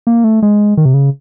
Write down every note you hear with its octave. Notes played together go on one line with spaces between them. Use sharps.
A#3
A3
G#3
D#3
C3
C#3